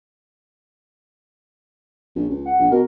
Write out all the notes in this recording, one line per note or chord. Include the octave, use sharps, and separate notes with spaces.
A#1
C#2
F#5
A#1
B2 A#4